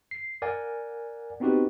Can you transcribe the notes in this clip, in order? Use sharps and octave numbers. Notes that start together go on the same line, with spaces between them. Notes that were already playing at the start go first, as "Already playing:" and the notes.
C7
A#4 D5 F#5 G#5
B3 C4 D#4 F#4 G4 B4